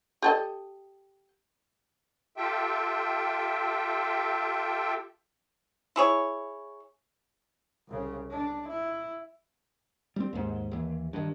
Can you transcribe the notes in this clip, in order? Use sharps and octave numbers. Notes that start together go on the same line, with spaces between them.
G4 A4 D#5
F4 G4 A4 E5 G5
E4 G#4 C#5
C2 C#3
D4
E4
G3 C4
D#2 G#2
D#2 E3
G2 D#3